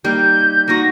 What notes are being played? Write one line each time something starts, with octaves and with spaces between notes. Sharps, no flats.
G3 A#3 D#4 G6
A#3 D#4 F#4 A#6